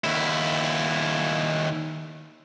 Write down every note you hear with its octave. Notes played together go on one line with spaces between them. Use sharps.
D#2 E4